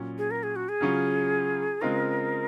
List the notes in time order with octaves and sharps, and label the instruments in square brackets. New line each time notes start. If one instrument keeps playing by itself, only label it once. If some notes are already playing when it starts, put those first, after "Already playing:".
Already playing: [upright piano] A#2 F#3 C#4
[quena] G#4
A#4
G#4
F#4
G#4
[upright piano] C#3 F#3 C#4 F4
[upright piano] C#3 G#3 C4 F4 [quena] A#4